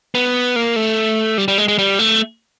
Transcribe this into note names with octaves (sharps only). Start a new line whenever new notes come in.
B3
A#3
A3
G3
G3
G#3
G#3
G3
A3